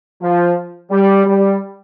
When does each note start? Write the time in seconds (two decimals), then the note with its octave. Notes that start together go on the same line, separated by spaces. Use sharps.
0.21 F3
0.91 G3
1.26 G3